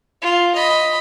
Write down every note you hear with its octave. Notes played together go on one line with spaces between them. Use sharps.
F4
D#5 B5